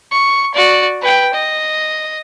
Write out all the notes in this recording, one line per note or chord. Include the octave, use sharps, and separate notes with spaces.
C#6
F#4 D5
B4 G5
D#5